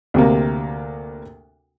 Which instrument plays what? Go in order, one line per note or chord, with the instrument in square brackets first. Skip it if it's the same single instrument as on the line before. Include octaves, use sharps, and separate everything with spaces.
[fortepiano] D2 C3 A#3